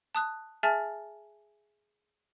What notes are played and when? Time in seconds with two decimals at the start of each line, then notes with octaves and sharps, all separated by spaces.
0.15 A5 D#6 F#6
0.63 G#4 E5 G#5 A5 F6 A6